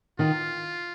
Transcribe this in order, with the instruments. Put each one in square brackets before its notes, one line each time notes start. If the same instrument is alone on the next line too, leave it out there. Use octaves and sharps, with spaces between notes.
[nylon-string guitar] D#3 [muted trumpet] F4